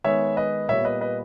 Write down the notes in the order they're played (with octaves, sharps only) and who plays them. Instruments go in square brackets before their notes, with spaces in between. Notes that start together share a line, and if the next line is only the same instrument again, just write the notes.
[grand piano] D#3 G#3 B3 C#5 E5
B4 D#5
A#2 G3 B3 C#5 E5
B4 D#5
B4 D#5